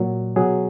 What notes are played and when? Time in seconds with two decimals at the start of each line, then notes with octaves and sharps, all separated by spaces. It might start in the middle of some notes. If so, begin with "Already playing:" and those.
Already playing: A#2 F#3
0.36 B2 F#3 G#4